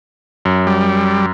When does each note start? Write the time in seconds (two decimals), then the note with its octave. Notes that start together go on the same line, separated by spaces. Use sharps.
0.45 F#2
0.67 G3